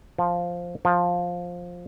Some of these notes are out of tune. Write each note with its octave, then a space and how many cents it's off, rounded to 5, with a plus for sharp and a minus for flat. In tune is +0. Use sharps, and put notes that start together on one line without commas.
F3 +0
F3 +10